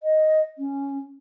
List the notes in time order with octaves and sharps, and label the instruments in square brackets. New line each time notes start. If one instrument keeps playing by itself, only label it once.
[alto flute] D#5
C#4